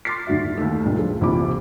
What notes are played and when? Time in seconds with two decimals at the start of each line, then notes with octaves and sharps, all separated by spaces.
0.05 C6 D6 F6 A6 B6 C7
0.27 D#1 G#2 D3 F#4 E5
0.58 D#2 A3
0.85 C#2 G2 A#2
0.99 F3 G#4
1.21 D#1 A#1 C3 E3 B5 D6